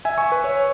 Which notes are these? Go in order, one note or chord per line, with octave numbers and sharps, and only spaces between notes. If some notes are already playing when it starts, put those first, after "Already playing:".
E5 G#5
G#5 C#6
B4
C#5